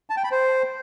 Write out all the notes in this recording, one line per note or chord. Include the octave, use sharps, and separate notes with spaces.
A5
G5
B5
C5